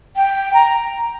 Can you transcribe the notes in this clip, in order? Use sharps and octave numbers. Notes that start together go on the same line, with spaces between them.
G5
A#5